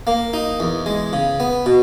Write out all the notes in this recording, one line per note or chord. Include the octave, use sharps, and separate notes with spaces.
A#3
D#4
E2
G#3
C#3
B3
B2